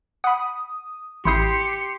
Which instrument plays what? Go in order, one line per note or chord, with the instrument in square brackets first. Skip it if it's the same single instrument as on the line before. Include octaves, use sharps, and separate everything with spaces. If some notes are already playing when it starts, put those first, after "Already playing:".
[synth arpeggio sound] F#5 B5 [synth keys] D#6
[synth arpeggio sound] A1 E4 D#6 [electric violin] G4 C#7 [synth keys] C6 G6 C7